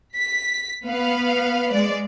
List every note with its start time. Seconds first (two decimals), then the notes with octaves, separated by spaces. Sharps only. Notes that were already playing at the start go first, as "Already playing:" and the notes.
0.17 B6
0.88 B3 B4 F5
1.72 G#3 D5